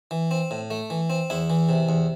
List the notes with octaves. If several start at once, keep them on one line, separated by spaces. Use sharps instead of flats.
E3
C4
A2
A3
E3
C4
E2 E4
E3
C3
E2